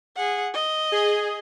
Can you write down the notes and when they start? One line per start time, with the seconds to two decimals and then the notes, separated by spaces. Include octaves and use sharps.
0.16 G#4 F#5
0.53 D#5
0.92 G#4